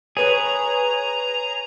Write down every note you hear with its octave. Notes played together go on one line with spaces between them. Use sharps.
G#4 B4 C#5 A#5